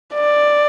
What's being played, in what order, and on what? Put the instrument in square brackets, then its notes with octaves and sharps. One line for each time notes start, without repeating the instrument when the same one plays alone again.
[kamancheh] D5